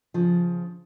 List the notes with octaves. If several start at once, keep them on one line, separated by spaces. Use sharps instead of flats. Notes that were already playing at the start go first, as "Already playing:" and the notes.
C#3 F3